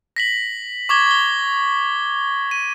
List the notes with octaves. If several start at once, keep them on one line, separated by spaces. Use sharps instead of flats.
A#6 B6 F#7
C#6 D6 G#6 G7
C#6 G7
D#7